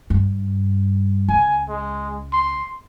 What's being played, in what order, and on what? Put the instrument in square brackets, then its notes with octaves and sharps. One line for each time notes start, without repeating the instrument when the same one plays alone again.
[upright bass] G2
[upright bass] C#2 [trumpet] G#5
[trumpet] G#3
C6